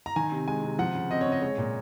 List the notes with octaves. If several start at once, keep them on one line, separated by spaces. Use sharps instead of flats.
A#5
D#3 G#5
C3
G#3 G#5
C3
F3 F#5
C#3
C4 D#5
C#5
C#3
D#5
G#3 C#5
A#2